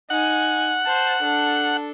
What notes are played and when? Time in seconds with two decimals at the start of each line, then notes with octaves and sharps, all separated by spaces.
0.10 D#4 F#5 G#5
0.85 C5 A5
1.23 D4 A4